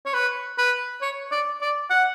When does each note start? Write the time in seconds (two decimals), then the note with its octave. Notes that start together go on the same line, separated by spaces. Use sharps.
0.05 C#5
0.14 B4
0.58 B4
1.02 C#5
1.31 D5
1.61 D5
1.90 F#5